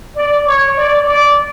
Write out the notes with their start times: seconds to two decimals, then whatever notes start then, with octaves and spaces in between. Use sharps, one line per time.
0.16 D5
0.47 C#5
0.77 D5
1.07 D5